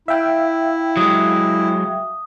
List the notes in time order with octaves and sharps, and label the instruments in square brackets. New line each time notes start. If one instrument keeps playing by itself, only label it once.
[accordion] E4 [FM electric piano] E5 F5 G5
[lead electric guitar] F#3 G#3 [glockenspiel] D#6